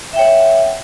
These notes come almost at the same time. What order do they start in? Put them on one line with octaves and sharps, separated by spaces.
E5 G5 C#5 F#5